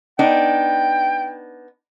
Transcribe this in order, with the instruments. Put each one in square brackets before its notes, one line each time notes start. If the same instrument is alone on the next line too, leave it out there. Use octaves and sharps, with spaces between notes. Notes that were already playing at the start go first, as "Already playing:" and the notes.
[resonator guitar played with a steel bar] B3 D4 D#4 [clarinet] G5